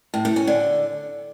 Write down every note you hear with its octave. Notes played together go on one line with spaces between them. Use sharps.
A2
A3
C#4
D3